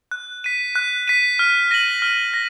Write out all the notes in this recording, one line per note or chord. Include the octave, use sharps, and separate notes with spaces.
F#6
B6 D#7
F#6
B6 D#7
F6
A#6 D#7 F#7
F6
A#6